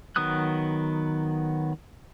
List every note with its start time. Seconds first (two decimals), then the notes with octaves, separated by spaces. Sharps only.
0.16 D#3 F#3 B3 D#6 F#6